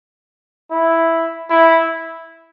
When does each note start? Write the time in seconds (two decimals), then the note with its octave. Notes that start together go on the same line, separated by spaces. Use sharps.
0.71 E4
1.50 E4